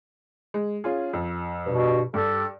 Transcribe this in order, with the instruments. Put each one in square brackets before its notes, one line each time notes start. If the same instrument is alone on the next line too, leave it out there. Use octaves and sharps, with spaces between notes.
[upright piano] G#3
C#4 F4 G#4
F2
[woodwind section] G2 B2
[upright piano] G2 [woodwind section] G4 A4